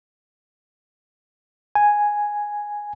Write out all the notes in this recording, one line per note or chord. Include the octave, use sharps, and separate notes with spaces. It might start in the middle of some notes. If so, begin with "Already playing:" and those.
G#5